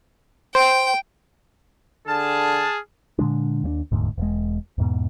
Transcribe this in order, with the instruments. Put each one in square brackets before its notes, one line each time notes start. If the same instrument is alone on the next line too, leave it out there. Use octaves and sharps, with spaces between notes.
[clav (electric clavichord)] C5 [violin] G5
[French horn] D3 [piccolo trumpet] G#4 [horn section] A5 [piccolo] F6
[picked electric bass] A#2 D3 G#3 D4
D#2 G3 D4
E1 D2 G#2
E1 G#3
E2 G#2 B2